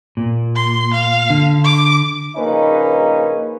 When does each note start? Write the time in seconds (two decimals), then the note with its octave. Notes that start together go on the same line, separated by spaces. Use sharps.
0.17 A#2
0.56 C6
0.93 F5
1.30 D3
1.64 D6
2.36 A#1 C#3 A#3 C#4 D#4 B4